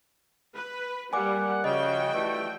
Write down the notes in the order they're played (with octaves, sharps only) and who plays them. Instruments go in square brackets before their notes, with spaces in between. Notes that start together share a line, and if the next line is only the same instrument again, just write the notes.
[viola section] B4
[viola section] G3 [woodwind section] A#3 D5 F#5 [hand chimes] G#5 D6
[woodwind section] C#3 [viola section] F3 F#4 G5 [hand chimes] D#5
[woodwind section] E3 G3 A3